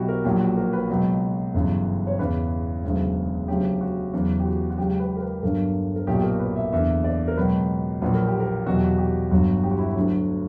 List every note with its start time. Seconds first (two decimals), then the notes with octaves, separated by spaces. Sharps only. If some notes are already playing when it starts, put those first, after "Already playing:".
Already playing: B1 B2 F#3 E4 F#4 G4
0.09 A#4
0.24 A#1 A#2 F#3 G4
0.41 F#4
0.57 A#4
0.73 B4
0.89 C#2 B2 F#3
1.54 G1 F#2 C#3 E3
2.07 C#5
2.19 E2 C#3 E3 B4
2.84 E1 D2 C#3 F#3
3.48 D2 C#3 F#3 G4
3.81 F#4
4.13 E2 C#3 F#3 E4
4.40 G4
4.45 F#4
4.70 F#4
4.78 C#2 C#3 F#3 G4
5.00 B4
5.17 A#4
5.21 B4
5.43 G1 G2 D3 F#3 A#4
5.96 A#4
6.07 B1 A#2 F#3 G4
6.18 G4
6.24 A#4
6.39 B4
6.56 E5
6.72 F#1 E2 D3 E5
7.04 D5
7.28 A#4
7.37 C#2 B2 F#3 B4
8.02 A#1 A#2 F#3 B4
8.14 A#4
8.27 G4
8.40 A#4
8.66 E2 B2 F#3 F#4
8.76 G4
8.85 F#4
8.98 G4
9.31 G1 G2 F#3 F#4
9.63 G4
9.71 F#4
9.78 E4
9.86 F#4
9.96 D2 D3 F#3